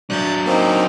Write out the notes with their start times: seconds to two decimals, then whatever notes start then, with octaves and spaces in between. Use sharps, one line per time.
0.10 F#3 D4 F#6 G6 A6
0.46 A#3 C4 D#4